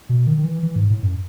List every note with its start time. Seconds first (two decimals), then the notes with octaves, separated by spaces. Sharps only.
0.09 B2
0.27 D#3
0.38 D#3
0.45 E3
0.63 E3
0.76 G#2
0.90 A2
1.03 F#2